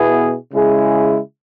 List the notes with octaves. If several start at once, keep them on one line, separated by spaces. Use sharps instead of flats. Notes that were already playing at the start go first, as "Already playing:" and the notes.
Already playing: B2 B3 E4 G#4
C#3 G#3 E4 G#4